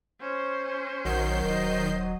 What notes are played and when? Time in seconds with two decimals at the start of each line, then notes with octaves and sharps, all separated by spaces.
0.21 C#4 C5
1.05 A#1 D#3 F#3 G6 C7
1.43 D#1 C5 D#5